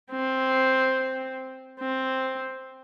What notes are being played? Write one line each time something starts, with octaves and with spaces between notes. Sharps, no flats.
C4
C4